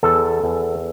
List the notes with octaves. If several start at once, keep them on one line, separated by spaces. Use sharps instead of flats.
E2 A4
E2